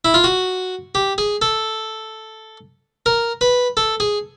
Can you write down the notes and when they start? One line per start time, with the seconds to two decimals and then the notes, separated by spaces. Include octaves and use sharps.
0.05 E4
0.14 F4
0.24 F#4
0.95 G4
1.18 G#4
1.42 A4
3.06 A#4
3.41 B4
3.77 A4
4.00 G#4